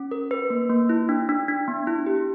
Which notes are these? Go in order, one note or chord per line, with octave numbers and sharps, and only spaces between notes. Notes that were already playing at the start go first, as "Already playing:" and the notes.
Already playing: C#4
A#4
B4
A#3
A#3
E4
D4
D4
D4
B3
E4
G4